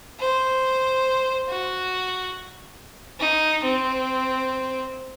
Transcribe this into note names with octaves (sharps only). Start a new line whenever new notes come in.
C5
F#4
D#4
C4